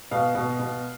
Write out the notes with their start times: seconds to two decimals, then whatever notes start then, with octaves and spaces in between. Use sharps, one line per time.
0.11 B2 F5
0.35 B2
0.59 B2